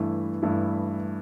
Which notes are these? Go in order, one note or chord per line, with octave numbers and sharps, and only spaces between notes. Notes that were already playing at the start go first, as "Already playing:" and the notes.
Already playing: G2 E3 A3 E4
G2 E3 A3 E4